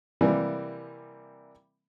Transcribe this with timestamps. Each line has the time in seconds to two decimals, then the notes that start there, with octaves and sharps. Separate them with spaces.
0.21 C3 E3 G3 A#3